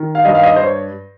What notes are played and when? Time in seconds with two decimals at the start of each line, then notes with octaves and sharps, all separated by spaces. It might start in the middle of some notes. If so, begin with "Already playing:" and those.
Already playing: D#3
0.15 F5
0.25 G2 D#5
0.35 F5
0.43 D#5
0.56 C5
0.63 C#5